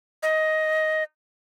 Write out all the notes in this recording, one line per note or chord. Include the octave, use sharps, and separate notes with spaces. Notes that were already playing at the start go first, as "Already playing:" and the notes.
D#5